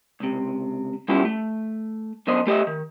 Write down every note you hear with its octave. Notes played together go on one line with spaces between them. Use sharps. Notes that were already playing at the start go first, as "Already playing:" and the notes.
C#2 C3
G3 B3 C#4 E4 F4 G4
A3
F#2 D3 B3 C5 D#5
A3 G4 C#5 D#5 E5
D#3